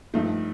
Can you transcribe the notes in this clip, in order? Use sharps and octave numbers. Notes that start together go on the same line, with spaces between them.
G2 F3 A3 D#4